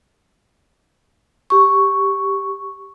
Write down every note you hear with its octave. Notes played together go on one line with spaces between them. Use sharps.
G4 C#6